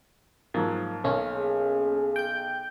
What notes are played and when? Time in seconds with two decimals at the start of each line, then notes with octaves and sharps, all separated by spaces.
0.54 G#2 F3 F#3 A#3
1.04 B1 A#3 C#4
1.35 G#4
2.16 G5 G6